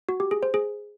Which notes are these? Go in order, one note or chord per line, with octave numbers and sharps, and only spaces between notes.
F#4
G4
G#4
C5
G#4